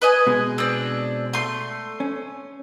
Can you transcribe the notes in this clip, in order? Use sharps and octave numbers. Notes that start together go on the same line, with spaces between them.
B4 D#5 G#5
B2 G#3
C4 D4
A3 C6
C#4